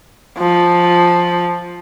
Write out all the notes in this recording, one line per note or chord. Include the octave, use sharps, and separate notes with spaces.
F3